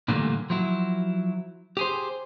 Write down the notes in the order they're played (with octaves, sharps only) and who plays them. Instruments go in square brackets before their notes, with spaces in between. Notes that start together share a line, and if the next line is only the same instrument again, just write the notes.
[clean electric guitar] A#2 D3 E3 G3 A3 A#3
F3 F#3 E4
G4 G#4 C5